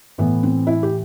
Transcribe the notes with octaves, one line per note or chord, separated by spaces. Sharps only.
A2 E3 B3
C4
E4
G4